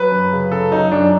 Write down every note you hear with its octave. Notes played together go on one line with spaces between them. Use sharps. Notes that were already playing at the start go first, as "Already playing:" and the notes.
Already playing: F#3 B4
F#2
C#3
F#2 A4
F#3 D#4
F#2 D4